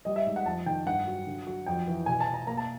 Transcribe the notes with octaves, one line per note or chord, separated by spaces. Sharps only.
G3 D#5
E5
G#2
F#5
F2 A5
D#3 G5
G2 F#5
F#3
D3
F#3
F2 G5
E3
B2 G#5
A5
B2
A#5
A#3 A#5
A5